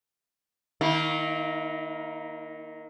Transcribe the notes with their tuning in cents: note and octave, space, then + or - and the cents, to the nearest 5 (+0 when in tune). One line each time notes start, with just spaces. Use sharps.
D#3 +0 A#3 +0 E4 -35